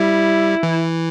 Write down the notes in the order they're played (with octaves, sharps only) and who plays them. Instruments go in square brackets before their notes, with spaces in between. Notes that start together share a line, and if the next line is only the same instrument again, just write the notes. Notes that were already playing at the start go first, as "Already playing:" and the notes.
Already playing: [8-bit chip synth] G3 [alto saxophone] E4
[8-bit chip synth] E3